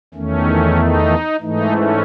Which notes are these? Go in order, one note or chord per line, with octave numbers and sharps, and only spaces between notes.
E2 D#3 A3 C#4
D#4
G#2 E3 A3 D#4
C#4